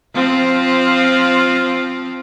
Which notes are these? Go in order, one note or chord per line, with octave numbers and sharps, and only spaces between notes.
F3 C4 F4